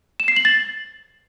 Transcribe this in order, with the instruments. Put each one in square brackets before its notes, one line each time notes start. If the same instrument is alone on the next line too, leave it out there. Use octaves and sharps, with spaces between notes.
[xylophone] E7
C7
F#7
A6